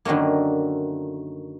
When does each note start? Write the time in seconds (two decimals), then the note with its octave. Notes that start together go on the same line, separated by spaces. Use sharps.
0.05 F#2 D3 D#3 A3 A#3